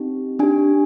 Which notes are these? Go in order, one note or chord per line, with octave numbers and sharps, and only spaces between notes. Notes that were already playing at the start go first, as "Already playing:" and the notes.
Already playing: C4 D#4 G4
D4 G4 G#5